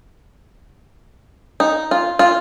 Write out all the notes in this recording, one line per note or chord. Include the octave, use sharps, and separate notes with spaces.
D#4
F4
F4